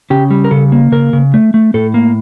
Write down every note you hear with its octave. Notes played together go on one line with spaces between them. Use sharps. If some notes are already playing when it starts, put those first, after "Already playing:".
C#3 G4
G3
A#4
C#3 A4
A#3
C#3 A#4
C#3
A3
A3
A2 A4
A#3